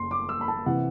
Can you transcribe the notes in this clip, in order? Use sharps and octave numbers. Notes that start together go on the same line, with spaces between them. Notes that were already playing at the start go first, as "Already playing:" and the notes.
Already playing: F#1 C6
D6
E6
B5
A5
C3 E3 F#5